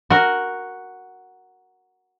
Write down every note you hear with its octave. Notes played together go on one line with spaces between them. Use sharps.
F#4 A#4